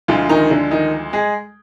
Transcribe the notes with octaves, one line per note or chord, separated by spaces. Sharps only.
D2 D3 F3 G#3 F4
D#3 D#4
D3 D4
D#3 D#4
G#3 G#4